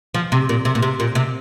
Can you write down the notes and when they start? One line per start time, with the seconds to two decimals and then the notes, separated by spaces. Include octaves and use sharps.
0.14 F3
0.32 C3
0.49 A#2
0.65 C3
0.75 A#2
0.83 C3
1.00 A#2
1.15 C3